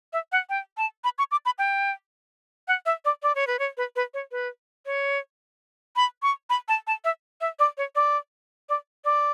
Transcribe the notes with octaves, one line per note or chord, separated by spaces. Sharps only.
E5
F#5
G5
A5
B5
C#6
D6
B5
G5
F#5
E5
D5
D5
C#5
B4
C#5
B4
B4
C#5
B4
C#5
B5
C#6
B5
A5
A5
E5
E5
D5
C#5
D5
D5
D5